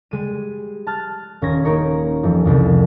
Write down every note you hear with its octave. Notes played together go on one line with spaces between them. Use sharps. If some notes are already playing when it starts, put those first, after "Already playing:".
G3 G#3 D#7
A5 F6 F#6 A6
D#1 C#4 G#6 A#6
A#3 C#4 D#4 A#4 C#5
F2 E3 F3 G3
C2 F2 E3 F3